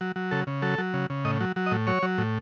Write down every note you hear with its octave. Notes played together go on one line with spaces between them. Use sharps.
F#3
F#3
C#3 A4
C#3
F#3 A4
F#3
C#3
C#3
A2 D#5
F#3
F#3
D#5
A2
F#3 C#5
F#3
A2